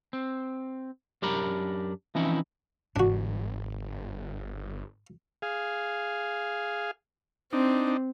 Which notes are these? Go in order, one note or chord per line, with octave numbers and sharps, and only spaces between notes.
C4
F#2 D4 G4 A#4 A#5 B5
E3 F3 C4 C#4 D#4 E4
G1 G#2 E3 D4 F#4
G#4 F5
C4 D4 D#4